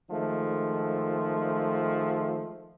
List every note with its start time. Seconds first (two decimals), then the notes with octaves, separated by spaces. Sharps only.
0.10 D#3 F3 G#3 A3